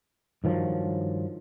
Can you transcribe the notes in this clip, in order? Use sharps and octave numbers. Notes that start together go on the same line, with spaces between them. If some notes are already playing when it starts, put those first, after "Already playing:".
G2 D#3 F3 F#3